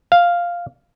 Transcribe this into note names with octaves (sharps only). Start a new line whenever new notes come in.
F5